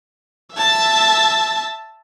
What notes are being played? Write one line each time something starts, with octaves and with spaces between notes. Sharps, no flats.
E5 A5